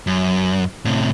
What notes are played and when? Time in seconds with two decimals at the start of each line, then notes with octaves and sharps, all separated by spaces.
0.07 F#2
0.85 A2 C3